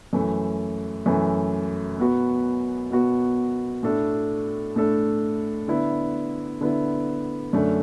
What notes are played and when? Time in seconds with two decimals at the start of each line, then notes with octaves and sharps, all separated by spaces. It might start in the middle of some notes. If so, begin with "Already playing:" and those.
0.13 F#2 E3 A3
1.06 F#2 E3 A3
1.98 B2 B3 F#4
2.91 B2 B3 F#4
3.83 A2 A3 D4 A4
4.76 A2 A3 D4 A4
5.68 D3 B3 E4
6.61 D3 B3 E4
7.53 F#2 D3 A3 D4